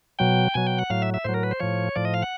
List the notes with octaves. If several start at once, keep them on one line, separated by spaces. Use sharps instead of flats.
B2 F#3 G5
B2 F#3 G#5
G5
F#5
A2 F#3 F5
E5
E5
A2 F#3 C5
A#4
B4
C5
A2 F3 C#5
A2 F3 D5
D#5
F5
F#5